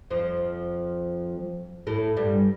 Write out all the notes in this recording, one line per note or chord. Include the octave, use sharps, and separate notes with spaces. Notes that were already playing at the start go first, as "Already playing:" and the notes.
F2 F3
A2 A3
G2 G3